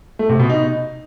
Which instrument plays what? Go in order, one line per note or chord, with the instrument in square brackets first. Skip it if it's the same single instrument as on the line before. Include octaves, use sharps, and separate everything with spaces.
[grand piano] A3
C3
B2
D#4